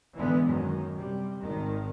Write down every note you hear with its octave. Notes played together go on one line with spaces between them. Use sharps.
D3 E3 G#3 B3
F#2 D#3
C3 G3
G#1 D#3